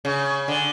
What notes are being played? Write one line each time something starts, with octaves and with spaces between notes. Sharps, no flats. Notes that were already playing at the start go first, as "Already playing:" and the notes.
C#3
D3